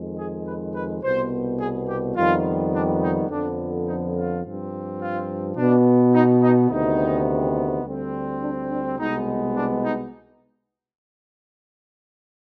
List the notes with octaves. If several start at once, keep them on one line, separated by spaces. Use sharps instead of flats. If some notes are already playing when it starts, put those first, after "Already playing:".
Already playing: F2 D#3 G#3
G#4
B4
B4
C2 B2 B3 C5
G#4
G4
F2 D#3 G3 B3 F4
D4
D#4
F2 D3 F3 B3 D4
D#4
F4
G2 F3 C4
F4
B2 B3 D4
D#4
D#4
D2 C3 D#3 B3 D#4
D2 D3 G3 C4
D4
D4
C2 B2 G#3 B3 D#4
D4
D#4